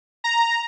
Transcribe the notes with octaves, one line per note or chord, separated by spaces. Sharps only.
A#5